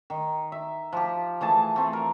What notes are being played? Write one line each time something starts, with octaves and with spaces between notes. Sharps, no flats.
D#3
E5
F3 G4
E3 A3 G#4 A5
A3 C4
A#4